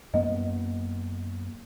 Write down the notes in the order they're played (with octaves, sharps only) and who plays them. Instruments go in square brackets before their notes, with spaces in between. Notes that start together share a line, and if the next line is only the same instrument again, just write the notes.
[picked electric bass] F#2 A#3 B3 [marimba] D#5